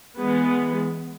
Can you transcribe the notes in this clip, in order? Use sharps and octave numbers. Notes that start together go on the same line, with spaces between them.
E3 G#3 B3